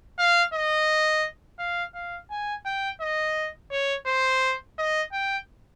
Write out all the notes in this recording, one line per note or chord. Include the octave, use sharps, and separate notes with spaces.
F5
D#5
F5
F5
G#5
G5
D#5
C#5
C5
D#5
G5